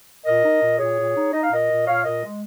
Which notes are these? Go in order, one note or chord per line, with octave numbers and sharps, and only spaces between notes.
A#2 A#4 D#5
D#4
A#2
A#2 G#4 C#5
A#2
D#4
D#4 D#5
F5
A#2 A#4 D#5
A#2
A#2 C#5 F5
A#2 A#4 D#5
G#3